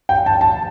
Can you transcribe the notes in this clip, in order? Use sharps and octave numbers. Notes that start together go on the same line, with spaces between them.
G5
A5
A5